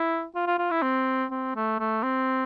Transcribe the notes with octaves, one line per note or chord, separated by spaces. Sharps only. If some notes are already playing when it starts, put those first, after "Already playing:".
Already playing: E4
F4
F4
F4
E4
C4
C4
A3
A3
C4